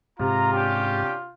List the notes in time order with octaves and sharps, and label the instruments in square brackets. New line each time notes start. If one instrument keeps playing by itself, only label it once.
[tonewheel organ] G#2 [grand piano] C3 [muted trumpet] F4 [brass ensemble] A#5
[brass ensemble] C#4 D4 G4